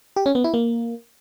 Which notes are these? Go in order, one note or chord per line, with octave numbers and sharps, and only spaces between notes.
G4
C#4
B3
E4
A#3